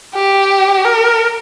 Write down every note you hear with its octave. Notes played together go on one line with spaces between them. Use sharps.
G4
A#4